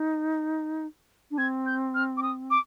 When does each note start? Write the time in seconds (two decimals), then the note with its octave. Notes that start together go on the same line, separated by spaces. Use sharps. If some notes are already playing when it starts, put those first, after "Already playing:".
Already playing: D#4
1.31 D4
1.38 C4 G#6
1.66 G6
1.94 F6
2.17 D6
2.23 D#6
2.50 D6